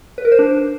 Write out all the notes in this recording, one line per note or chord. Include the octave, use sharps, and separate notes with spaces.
B4
A#4
C5
D4